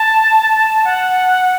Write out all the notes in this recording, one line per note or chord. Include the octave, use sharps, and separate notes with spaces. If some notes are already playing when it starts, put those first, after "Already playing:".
Already playing: A5
F#5